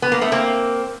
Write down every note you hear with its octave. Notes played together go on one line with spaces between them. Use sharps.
B3
A#3
A3 B3
A#3 C4